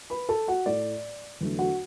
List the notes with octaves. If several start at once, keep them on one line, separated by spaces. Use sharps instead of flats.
B4 B5
A4 A5
F#4 F#5
A2 A3 D5
E2 D3 F#3 A3
F#4 F#5